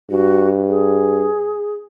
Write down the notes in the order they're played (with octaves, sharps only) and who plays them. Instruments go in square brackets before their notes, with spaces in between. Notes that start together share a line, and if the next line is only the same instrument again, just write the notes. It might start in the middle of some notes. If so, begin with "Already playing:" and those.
[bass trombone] G2 [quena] F#4
[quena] G#4